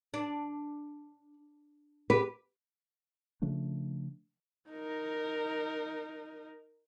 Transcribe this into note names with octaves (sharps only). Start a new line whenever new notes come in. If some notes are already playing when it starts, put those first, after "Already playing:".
D4
G4 B4
C#3 F3 A3 D4
D#4 A#4